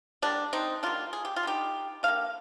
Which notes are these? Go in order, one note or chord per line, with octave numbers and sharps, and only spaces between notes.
D3 G3 A#3 D4
C4 D#4
D3 G3 A#3 D4 F4
G#4
G4
F4
D3 G3 A#3 D#4 G4
D3 G3 A#3 F5